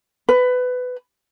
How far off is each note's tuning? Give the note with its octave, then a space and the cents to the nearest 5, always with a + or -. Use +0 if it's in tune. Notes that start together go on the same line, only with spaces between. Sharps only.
B4 +20